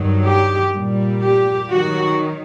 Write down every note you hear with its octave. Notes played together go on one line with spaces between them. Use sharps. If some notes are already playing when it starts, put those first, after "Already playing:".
Already playing: G2 D#3 F#3
G4
A#2 G3
G4
D#3 F#3 F#4